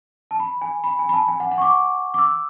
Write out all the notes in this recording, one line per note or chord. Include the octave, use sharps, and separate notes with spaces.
A5
B5
G#5
B5
G#5
B5
A5
G#5
F#5
F#5
C#6
D6
D6
E6